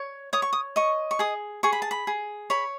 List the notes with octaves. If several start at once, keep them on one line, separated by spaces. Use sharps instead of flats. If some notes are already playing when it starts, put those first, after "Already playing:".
Already playing: C#5
C#5 D#6
C#6
D#6
D#5 C#6
C#6
G#4 D#6
G#4 C#6
B5
A5
B5
G#4
C#5 B5